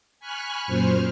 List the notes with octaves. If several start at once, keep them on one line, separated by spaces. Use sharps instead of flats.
G#5 B5 C#6 F6 F#6
F#2 A#2 C5 F6